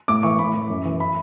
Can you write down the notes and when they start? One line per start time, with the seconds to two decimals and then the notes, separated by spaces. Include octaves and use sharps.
0.08 A2 D6
0.23 E3 C#6
0.39 A2 B5
0.54 E3
0.70 F#2
0.85 E3
1.00 B5